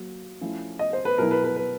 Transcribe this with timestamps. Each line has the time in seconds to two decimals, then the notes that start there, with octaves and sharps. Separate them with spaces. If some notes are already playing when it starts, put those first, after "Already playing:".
Already playing: F#3 A#3
0.41 F3 A3 C#4 E4
0.79 D#5
0.93 C5
1.05 B4
1.18 B2 F#3 B3 E4 A#4
1.31 B4
1.44 B4
1.56 B4